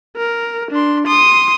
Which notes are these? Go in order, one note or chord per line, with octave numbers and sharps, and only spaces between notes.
A#4
D4 C6
C6 D#6